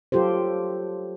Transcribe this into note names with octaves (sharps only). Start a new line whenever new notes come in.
F#3 F4 G4 A4 C5